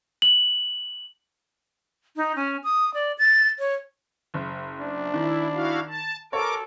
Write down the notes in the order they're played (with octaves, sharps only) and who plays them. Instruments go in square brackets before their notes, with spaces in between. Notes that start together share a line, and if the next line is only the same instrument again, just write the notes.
[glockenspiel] F#7
[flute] D#4
C#4
D#6
D5
A6
C#5
[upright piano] F#1
[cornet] D4
[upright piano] D#3 [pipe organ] E4
[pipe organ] E4 F#4 F5
A5
[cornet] A4 [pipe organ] A#4 D6 [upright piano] C#5